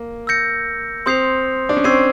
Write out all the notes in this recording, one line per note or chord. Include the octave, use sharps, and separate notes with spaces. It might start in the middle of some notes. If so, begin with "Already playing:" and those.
Already playing: A#3
E6 G6 A#6 C#7
C4 C6 D#6 G6 C7 F7
D4
C#4
C4 C#6 E6 G#6 C7 D#7